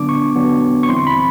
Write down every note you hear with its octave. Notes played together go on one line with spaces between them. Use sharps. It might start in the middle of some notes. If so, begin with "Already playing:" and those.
Already playing: D3 F#3 B3 D4 D6
C#6
D3 F#3 B3 D4
C#6
E3 G3 C4 E4 C6
B5